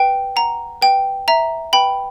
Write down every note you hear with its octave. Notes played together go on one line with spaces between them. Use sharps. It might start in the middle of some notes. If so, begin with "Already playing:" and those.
Already playing: B4 G5
F#5 A#5
B4 G5
E5 A#5
B4 G5 B5